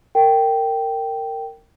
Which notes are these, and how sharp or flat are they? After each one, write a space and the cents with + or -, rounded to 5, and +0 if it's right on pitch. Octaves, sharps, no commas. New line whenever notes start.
A#4 -20 G5 -10